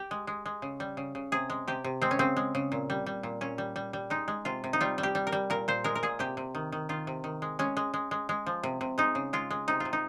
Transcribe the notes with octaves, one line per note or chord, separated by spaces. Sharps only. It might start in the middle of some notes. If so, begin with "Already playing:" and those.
Already playing: G4
G#3
G#3
G#3
C#3
G3
C#3
C#3
C3 G#4
G#3
C3 G4
C3
G#3 C4
C#4
C#3 C4
G#3
C#3
A#2
G3
G3
A#2
A#2 C#4
G3
G3
G3
G#3 D#4
G#3
C3 F4
C3
D#4
G3 F4
G3
G4
G3
A#4
G3
A#2 A#4
A#2 C5
G#3 A#4
A#4
A#2 G#4
C3 G4
C3
D#3
D#3
D#3 F4
C3
D#3
G#3
G#3 C#4
G#3
G#3
G#3
G#3
F3
C3
C3
G#3 D#4
C#3
G#3 F4
G#3
C3 D#4
C3 F4
D#4